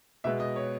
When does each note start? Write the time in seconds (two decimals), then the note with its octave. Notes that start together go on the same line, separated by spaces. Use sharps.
0.24 B2 G#3 B3 E5
0.40 D#5
0.56 C#5